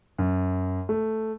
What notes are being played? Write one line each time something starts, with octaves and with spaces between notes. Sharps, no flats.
F#2
A3